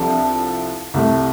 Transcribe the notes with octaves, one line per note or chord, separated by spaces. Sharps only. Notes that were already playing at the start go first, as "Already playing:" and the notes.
Already playing: C2 C3 F3 D4 A4
C2 C3 A3